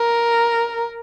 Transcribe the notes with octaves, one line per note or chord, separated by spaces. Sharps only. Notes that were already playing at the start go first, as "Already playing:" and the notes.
Already playing: A#4